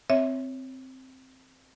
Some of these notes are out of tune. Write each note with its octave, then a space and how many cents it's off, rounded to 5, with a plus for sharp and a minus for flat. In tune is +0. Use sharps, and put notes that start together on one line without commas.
C4 +0 C#5 +0 E5 -10